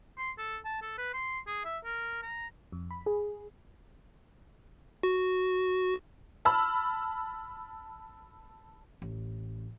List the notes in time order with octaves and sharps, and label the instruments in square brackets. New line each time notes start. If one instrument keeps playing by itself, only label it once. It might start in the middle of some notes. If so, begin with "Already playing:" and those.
[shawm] C6
A4
A5
A4
B4
C6
G#4
E5
A#4
A#5
[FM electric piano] F2
B5
G#4
[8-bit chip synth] F#4
[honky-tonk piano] A5 B5 E6 F6
[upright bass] A1